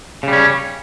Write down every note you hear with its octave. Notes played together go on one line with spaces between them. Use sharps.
C#3 G3 C#4